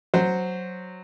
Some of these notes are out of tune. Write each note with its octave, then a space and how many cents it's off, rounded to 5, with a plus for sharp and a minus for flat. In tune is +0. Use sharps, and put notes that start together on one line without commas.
F#3 +0 C5 +0